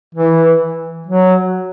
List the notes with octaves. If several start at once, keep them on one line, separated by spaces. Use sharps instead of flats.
E3
F#3